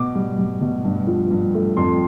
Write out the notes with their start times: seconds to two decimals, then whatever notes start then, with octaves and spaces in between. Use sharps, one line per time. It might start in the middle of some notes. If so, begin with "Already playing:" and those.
Already playing: B2 D6
0.15 G3
0.38 G3
0.61 B2
0.84 G2
1.07 F3
1.31 G2
1.54 A3
1.77 F2 C6